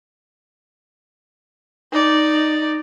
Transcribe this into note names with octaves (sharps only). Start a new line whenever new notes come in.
D#4 D5